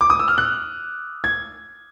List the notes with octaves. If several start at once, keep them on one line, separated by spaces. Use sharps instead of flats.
D6
D#6
E6
F6
F#6
G#6